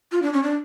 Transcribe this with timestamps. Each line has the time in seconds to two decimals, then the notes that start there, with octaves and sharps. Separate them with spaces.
0.12 F4
0.22 D4
0.33 C#4
0.43 D4